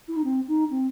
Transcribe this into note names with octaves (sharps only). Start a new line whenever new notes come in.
E4
D#4
C4
D#4
C4